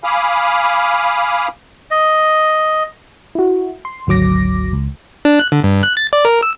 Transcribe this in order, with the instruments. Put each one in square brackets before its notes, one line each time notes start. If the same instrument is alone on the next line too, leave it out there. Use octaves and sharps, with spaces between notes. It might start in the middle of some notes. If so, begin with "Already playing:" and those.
[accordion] F5 G#5 B5 D6 D#6 F6
[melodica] D#5
[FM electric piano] E4 F#4
C6
G#1 D2 F#3 D6 A#6
C#2
[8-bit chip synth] D4
F#6
D3
G2
F#6
A6
D5
A#4
E6